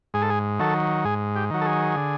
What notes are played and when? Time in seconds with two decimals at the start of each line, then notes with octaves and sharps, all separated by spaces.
0.14 G#2 G#4
0.22 A4
0.30 G#4
0.59 D#3 F#3 A4
1.05 G#2 G#4
1.36 G4
1.51 D#3 F#3
1.61 A4
1.66 G#4
1.96 D3